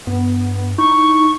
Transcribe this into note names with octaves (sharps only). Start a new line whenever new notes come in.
G2 B3
D#4 E4 C#6